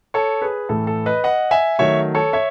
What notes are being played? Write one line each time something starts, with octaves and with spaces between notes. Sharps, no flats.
A4 C#5
G#4 B4
A2 E3 A3 A4
A4
B4 D#5
D#5 F#5
E5 G#5
D#3 F#3 A3 C#5 E5
A4 C#5
C#5 E5